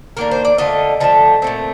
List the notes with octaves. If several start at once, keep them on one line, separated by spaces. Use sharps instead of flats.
D#3 A#3 D4 A#4
C5
D5
D3 A3 D4 F4 D#5
D3 F3 A3 A5
A#2 A3 C4